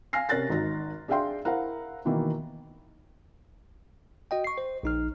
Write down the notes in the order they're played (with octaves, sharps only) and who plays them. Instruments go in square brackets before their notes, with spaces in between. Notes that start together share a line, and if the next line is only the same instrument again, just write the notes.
[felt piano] F5 G#5 F6 A#6 C7
C3 C#4 A#4 F#6 A6 A#6
G#1 D#4 A#6
D4 G#4 E5 F5 G5 C6
E4 A#4 C5 F5 F#5 A#5
B2 D#3 E3 A#3 E4
[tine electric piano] F#4 D#5 G5
C#6 C7
C5
A#1 D#4 F6